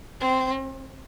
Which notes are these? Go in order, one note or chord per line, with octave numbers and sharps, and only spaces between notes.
C4